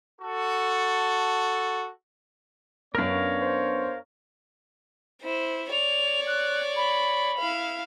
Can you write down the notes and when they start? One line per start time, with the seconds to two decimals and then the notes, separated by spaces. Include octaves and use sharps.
0.21 F#4 A4
2.95 F#2 B3 D4 A#4 C#5 F5 F6
3.40 C5
5.23 E4 C5
5.72 C#5 D5 F7
6.27 F#6
6.76 B5
7.39 E4 F5